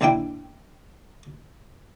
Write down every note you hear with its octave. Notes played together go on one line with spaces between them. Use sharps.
A#1 D#3 D4 E4 G5